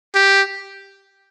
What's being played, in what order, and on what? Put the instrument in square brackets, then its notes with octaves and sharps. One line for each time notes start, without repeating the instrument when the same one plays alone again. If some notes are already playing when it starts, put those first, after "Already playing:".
[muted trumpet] G4